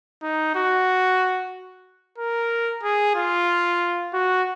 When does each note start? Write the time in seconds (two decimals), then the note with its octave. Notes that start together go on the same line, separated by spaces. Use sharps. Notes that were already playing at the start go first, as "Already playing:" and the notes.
0.23 D#4
0.55 F#4
2.18 A#4
2.83 G#4
3.16 F4
4.14 F#4